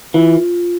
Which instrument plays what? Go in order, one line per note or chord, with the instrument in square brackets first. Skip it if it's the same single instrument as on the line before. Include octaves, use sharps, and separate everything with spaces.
[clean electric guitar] E3 [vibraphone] F4
[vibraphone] F4